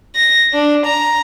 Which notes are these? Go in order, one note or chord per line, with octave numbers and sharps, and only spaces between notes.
A#6
D4
A#5